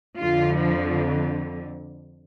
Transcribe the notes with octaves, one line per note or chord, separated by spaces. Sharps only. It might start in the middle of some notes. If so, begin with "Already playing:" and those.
F2 D3 F4
F3